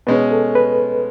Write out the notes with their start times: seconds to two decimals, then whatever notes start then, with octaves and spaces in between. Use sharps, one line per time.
0.07 B2 G#3 C#4 B4
0.31 A4
0.55 B4